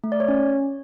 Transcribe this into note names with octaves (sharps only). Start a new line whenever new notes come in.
A3
D5
C#5
C#4